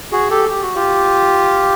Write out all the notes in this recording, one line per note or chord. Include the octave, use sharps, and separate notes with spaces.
F#4 G#4
G4 A4
G4
F#4
F4 G4